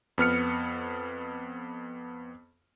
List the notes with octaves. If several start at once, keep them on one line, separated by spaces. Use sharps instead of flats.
F2 B3 F6 C#7